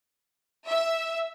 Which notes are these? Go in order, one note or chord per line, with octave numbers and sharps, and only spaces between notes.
E5